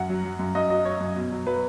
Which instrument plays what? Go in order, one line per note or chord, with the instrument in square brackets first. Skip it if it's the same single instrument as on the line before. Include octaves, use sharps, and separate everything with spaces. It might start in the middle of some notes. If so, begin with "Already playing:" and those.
Already playing: [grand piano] F#2 F#5
F#3
F#3
F#2
F#2 D#5
F#3 D#5
F#3 C#5
F#2
B2
F#3
F#3 B4